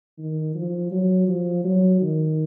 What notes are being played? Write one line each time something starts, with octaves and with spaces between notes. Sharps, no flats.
D#3
F3
F#3
F3
F#3
D#3